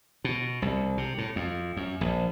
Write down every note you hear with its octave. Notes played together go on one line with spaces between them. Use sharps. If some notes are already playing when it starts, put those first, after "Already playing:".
B2
C2
C3
A2
F2
F#2
A#1